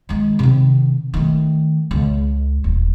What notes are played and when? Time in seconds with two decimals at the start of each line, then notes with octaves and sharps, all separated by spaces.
0.09 D#3 G#3
0.39 C3 D#3
1.14 D#3 A3
1.91 C#2
2.64 D#1